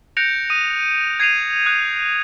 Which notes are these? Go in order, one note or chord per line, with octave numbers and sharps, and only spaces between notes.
F#6 G6 A#6 C#7 D7 F7
D#6 D#7
G#6 C7 D#7 F7
D#6 F#6